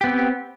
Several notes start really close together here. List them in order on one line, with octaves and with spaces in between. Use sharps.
G4 B3 C4